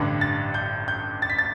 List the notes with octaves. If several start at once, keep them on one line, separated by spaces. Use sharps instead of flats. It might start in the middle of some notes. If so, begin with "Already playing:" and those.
Already playing: A1 G2 D3
A6
G6
G6
A6
B6
A6